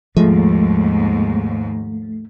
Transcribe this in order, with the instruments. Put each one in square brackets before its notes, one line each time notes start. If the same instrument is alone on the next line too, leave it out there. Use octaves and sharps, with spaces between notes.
[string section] D#2 G#2 [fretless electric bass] F3 [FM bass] G#3 [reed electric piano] A3